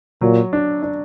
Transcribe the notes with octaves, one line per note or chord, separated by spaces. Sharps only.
A#2 F#3
D4
D4